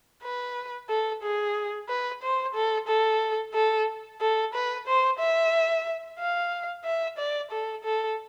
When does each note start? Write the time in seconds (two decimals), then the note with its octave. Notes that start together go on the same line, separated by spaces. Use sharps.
0.23 B4
0.89 A4
1.23 G#4
1.89 B4
2.23 C5
2.55 A4
2.88 A4
3.54 A4
4.21 A4
4.54 B4
4.87 C5
5.19 E5
6.19 F5
6.85 E5
7.18 D5
7.51 A4
7.84 A4